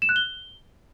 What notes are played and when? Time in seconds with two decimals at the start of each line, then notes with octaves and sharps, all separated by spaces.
0.02 E7
0.09 F#6
0.16 G7